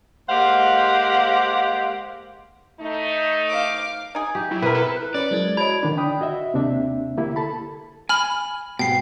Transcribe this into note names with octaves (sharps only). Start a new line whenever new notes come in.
G#3 A#3 G4 C5 F5 F#5
A3 D#4
F5 D6
D#4 G#4
G4
F#3 E4
B2 C4 G#4 A#4 B4
A4
F#6
C#4 B4 D5
F#3 G#3 E4 A#4 C5
F#4 C#5 D#5 A5 B5 G#6 D7
D3 D#3 D4
D4 G5 B5 D#6
F#4 D#5 E5
D#2 C3 A#3 C4 D4 E5
D3 A#3 E4 G4
A4 A5 B5
G#5 B5 F6
G#2 B2 G5 C7